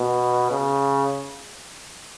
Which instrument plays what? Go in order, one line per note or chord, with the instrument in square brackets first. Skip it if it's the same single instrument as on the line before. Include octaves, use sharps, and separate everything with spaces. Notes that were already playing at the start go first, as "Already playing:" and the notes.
Already playing: [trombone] B2
C#3